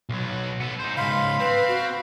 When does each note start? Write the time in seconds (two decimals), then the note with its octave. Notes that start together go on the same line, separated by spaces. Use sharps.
0.09 B1 F#3
0.60 B3 A4
0.79 D#4 C5
0.97 C#2 G#2 F5 B5 C6
1.40 C4 B4
1.68 F#4